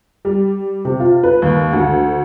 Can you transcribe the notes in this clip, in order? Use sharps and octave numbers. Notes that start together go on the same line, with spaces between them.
G3
C3
F4
B4
D#2
D2